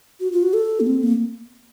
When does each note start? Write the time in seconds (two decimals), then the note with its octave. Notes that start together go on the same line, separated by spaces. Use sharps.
0.20 F#4
0.32 F4
0.43 F#4
0.54 A4
0.80 A#3
0.87 C4
1.03 A#3